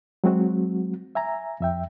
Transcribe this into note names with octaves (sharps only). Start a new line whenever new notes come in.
F#3 G#3 C4 F#4
E5 G#5 A#5
F2 E5 G5